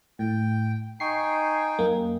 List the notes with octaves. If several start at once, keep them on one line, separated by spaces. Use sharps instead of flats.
A2 G5
D#4 G5 G#5 C#6 C7
F#2 A#3